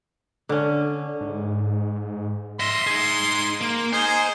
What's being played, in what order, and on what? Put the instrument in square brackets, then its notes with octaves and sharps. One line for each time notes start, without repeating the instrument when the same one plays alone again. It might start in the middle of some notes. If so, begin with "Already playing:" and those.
[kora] D3 C#4 [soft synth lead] D4
[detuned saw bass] G#2
[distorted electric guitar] D#5 E5 [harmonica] C6
[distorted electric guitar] D#4 G#4
A#3
[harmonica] D#4 G#4 G#5 [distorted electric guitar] C5